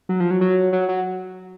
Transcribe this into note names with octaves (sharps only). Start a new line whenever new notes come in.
F#3
F3
F#3
F#3
F#3
F#3